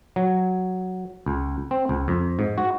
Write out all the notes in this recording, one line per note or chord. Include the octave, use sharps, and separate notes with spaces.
F#3
C#2
C4
C#2
F2
G#2
F#4